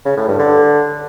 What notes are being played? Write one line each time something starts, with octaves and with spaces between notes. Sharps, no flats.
C#3
A2
G2
D3